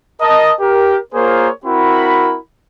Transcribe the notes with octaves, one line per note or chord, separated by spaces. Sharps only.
A#4 D#5 A5
G4 A#4
A#3 F4 G#4 A#4 C5 C#5
C4 E4 F#4 A#4 B5